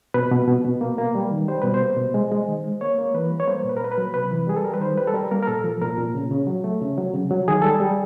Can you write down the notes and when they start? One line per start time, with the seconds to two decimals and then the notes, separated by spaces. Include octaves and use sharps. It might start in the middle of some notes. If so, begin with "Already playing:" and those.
0.14 B2 B4
0.32 B2
0.47 B2
0.65 B2
0.81 A#3
0.98 A#3
1.15 G3
1.31 D#3
1.48 G3 C5
1.62 B2 B4
1.74 C5
1.81 A#3
1.97 B2
2.14 G#3
2.31 G#3
2.48 D#3
2.64 G#3
2.81 A#3 C#5
2.98 A#3
3.14 E3 B4
3.31 G3
3.40 C#5
3.48 A#3 C5
3.64 A#2
3.69 B4
3.77 A#4
3.81 A#3 B4
3.92 B4
3.98 F#3
4.14 C3 B4
4.31 E3
4.47 G3 G#4
4.56 A4
4.64 G3 A#4
4.74 B4
4.80 D#3 C5
4.98 G3 B4
5.07 A4
5.14 G3 A#4
5.31 A#3 A#4
5.43 A#4
5.47 A#2 A4
5.64 F3
5.81 A#2 A#4
5.98 A#2
6.14 C#3
6.31 C#3
6.47 F#3
6.64 A3
6.81 C#3
6.98 F#3
7.14 C#3
7.31 F#3
7.48 D#3 G#4
7.62 G3 A4
7.75 G#4
7.80 G3